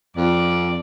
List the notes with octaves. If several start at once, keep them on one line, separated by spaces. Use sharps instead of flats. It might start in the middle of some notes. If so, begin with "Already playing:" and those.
F2 D5